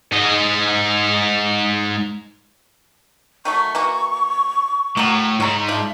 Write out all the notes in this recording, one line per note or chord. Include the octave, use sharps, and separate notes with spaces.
G#2 D#5
D#3 F#3 A3 C#6
E3 A#3 F#4
A2 F#3 A#3
G#2 C#5 A#5
F3 D4 F4 E5